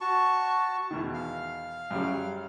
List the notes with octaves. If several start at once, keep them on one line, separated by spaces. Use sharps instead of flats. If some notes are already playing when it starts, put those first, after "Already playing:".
F#4 A5 C#6
E2 B2 D#3
F5
F#2 C#3 G3